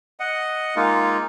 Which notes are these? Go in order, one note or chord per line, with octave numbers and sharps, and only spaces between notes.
D#5 F#5
G#3 A#3 D#4 F4